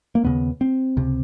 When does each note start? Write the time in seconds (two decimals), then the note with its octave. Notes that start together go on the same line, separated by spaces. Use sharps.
0.15 A#3
0.24 D#2 C#3 B3
0.61 C4
0.97 C#2 C3